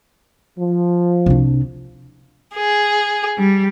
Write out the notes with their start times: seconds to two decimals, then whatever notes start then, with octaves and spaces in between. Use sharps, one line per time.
0.59 F3
1.26 C2 D4
2.55 G#4
3.38 G3